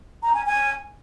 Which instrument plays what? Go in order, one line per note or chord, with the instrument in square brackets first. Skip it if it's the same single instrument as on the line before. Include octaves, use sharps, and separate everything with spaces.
[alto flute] A#5
G#5
G#5